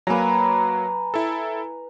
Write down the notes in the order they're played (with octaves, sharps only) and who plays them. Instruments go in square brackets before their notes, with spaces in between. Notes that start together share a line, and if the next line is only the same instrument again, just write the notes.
[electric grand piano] F#3 A#3 [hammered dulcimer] B4 G#5 A#5
[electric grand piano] E4 A4